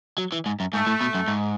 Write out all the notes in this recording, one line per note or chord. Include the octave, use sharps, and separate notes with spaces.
F#3
E3
G#2
F#2
G#2 A3
A2
B2
F#2
G#2